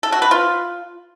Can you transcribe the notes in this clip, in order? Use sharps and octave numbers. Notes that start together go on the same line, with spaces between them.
A4
F#4
B4
F4